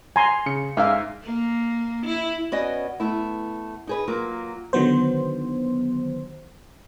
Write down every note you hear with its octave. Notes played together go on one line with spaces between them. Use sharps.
G#5 A#5 C6
C#3 C#7
G#2 C#4 A#4 E5 F5
A#3
E4
B3 C#4 F#4 B4 D5 D#5
A3 B3 E4
D#4 G#4 B4
F#3 A#3 F4 F#4
D3 D#3 F#3 B3 C5